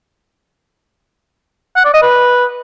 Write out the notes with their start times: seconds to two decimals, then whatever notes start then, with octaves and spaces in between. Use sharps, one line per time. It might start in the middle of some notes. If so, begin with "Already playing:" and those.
1.76 F#5
1.85 D5
1.94 D#5
2.02 B4